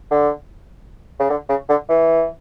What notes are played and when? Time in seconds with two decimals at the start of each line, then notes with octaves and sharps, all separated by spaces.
0.11 D3
1.20 C#3
1.30 D3
1.49 C#3
1.69 D3
1.89 E3